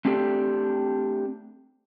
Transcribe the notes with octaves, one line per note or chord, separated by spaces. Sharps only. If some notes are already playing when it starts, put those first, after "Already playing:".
A3 C4 D4 G4 A4